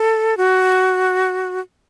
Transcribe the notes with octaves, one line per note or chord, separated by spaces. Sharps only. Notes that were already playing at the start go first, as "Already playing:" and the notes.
Already playing: A4
F#4